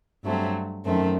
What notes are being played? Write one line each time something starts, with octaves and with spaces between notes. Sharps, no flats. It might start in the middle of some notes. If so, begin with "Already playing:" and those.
G2 F#3 A3 C4
F#2 D#3 A3 C4